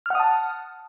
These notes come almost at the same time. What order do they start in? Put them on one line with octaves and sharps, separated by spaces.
F6 F#5 D#6 A5